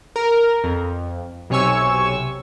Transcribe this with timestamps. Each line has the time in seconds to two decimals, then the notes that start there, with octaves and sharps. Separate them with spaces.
0.16 A#4
0.64 F2
1.50 B1 C3 C#5 G#5 C#6 E6